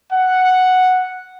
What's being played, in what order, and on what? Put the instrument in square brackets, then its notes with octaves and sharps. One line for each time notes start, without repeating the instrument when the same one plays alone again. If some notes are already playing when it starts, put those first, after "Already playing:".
[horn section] F#5